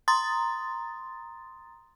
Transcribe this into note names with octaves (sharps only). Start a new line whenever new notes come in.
A#5 C6 D#6 A6